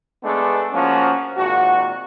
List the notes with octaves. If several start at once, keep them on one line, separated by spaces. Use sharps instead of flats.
G#3 A3 B3 D4
F3 A#3 C#4 F#4
G#1 A#2 F#4